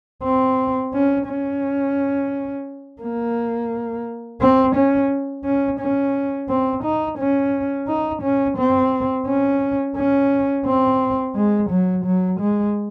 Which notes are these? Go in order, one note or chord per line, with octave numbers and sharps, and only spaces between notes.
C4
C#4
C#4
A#3
C4
C#4
C#4
C#4
C4
D#4
C#4
D#4
C#4
C4
C#4
C#4
C4
G#3
F#3
F#3
G#3